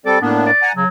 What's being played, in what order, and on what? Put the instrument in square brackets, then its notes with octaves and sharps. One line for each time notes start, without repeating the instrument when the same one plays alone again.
[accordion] G3 C4 A4 [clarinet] D5
[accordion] A2 A#3 D4 [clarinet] B3
[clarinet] D5
[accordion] F#5 G#5 A#5
[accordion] C#3 [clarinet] F#3